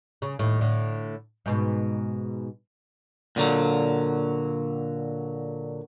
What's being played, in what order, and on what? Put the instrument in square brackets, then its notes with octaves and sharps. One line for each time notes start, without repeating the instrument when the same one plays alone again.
[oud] C#3
D#2 A2
A2 D3
G#2 B2
[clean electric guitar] A#2 D3 F#3